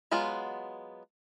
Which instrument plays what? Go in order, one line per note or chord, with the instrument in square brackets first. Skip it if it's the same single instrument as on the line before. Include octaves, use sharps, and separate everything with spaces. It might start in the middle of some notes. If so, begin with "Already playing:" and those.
[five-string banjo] F#3 G#3 B3 F4